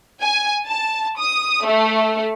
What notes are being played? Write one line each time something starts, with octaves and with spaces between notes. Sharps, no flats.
G#5
A5
D#6
A3